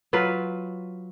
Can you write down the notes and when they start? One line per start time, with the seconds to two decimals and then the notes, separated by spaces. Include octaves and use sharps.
0.13 F#3 F4 B4